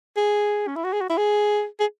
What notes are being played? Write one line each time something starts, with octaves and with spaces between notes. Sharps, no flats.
G#4
C#4
E4
F#4
G#4
F#4
E4
G#4
G#4